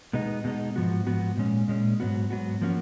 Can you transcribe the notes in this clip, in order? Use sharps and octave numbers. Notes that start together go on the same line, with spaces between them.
B2 G#3 B3 D#4
B2 G#3 B3 D#4
G#2 F3 B3 F#4
G#2 F3 B3 F#4
A#2 G#3 C#4
A#2 G#3 C#4
G#2 F#3 B3 F#4
G#2 F#3 B3 F#4
F3 A#3 C#4 F#4